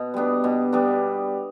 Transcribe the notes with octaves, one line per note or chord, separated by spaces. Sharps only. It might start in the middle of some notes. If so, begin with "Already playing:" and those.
Already playing: B2
G3 B3 D4
B2
G3 B3 D4